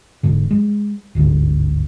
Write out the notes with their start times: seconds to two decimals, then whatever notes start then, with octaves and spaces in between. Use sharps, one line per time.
0.23 E1 E2 G#2 D3
0.51 G#3
1.15 G1 D2 G#2 D3